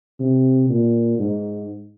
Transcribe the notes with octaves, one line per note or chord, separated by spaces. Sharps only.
C3
A#2
G#2